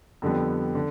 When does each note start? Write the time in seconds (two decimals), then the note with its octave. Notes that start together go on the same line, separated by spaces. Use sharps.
0.22 F2 D3 G3 B3
0.75 D3